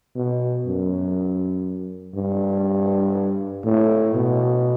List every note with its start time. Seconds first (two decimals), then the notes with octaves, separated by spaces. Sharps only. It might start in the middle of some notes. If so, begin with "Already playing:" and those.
0.16 B2
0.66 F#2
2.15 G2
3.65 A2
4.15 B2